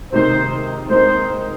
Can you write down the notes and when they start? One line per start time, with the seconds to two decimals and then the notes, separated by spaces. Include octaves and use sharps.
0.12 C3 D#3 G#3 D#4 A#4 C5
0.89 G#3 C4 D#4 A#4 C5